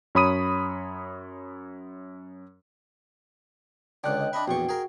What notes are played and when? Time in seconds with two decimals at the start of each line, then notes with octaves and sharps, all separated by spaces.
0.15 F#2 C#5 B5 D#6 D#7
4.04 C#2 D3 D5 G5 F#6
4.20 D#5
4.33 D4 D#5 E5 B5
4.48 A#1 E2 F#4 G5 C#6
4.69 G#4 A#4